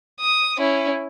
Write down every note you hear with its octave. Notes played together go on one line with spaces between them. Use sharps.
D#6
C#4 E4